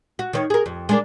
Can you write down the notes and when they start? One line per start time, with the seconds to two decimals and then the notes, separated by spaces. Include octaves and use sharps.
0.19 F#4
0.33 D#3 C5 C#5
0.50 G#4 A#4
0.66 F2
0.89 G#3 D4 A#4